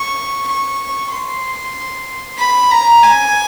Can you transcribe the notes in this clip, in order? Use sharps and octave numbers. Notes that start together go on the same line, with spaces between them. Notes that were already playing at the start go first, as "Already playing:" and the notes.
Already playing: C#6
C#6
C6
B5
A#5
G#5